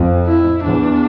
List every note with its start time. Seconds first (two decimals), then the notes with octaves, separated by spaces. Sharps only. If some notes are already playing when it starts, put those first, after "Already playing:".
Already playing: F2
0.26 E4
0.64 E2 D4